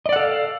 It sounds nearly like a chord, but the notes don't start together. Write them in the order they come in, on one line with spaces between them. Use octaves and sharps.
D#5 D5 F#5 A4 F5